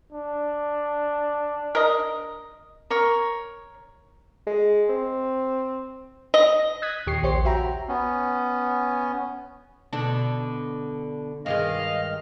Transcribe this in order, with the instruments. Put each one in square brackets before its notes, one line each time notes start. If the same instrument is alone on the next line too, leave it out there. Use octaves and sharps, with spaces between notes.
[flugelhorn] D4
[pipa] A#4 D#5
[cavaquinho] A#4 C#5 C#6
[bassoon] G#3
C4
[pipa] D#5
[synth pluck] D#6 F#6 G#6 A#6 B6 D#7
D#2 A#2 G4 C#6 C7
A#1 G4 C5 C#5 C7
F#4 E5 G5 A#5
[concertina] B3 C#4
[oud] B2 D3 D4
[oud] G2 D#3 G#3 [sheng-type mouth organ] D#5 F5 F6